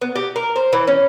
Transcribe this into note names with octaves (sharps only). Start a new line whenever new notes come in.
B3
G4
A#4
C5
E3
C#4